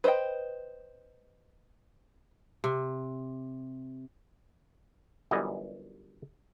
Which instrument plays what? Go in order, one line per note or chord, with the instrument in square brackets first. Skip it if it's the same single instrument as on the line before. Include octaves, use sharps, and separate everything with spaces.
[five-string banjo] B4 C5 D5 D#5 G5
[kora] C3
[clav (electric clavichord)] G1 F#2 E3 G3 D#5